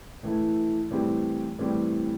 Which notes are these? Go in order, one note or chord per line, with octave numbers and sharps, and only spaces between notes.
A2 E3 A3 E4
A2 E3 G3 C4 G4
A2 E3 G3 C4 G4